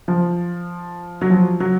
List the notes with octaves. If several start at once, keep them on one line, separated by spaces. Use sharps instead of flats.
F3
F#3
F3
F#3